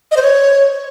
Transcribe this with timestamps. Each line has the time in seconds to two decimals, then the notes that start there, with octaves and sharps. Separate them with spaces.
0.11 D#5
0.17 C5
0.22 C#5